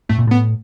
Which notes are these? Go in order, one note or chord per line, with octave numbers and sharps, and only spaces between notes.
A2 A3
A#2
A2 B3